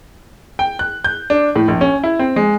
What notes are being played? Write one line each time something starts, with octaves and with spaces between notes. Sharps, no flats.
G5
F#6
G6
D4
A2
A#1
C#4
E4
C4
G#3